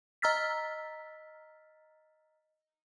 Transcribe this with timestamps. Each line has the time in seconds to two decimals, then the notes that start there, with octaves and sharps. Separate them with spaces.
0.22 D#5 A#5 E6 F6 A6 B6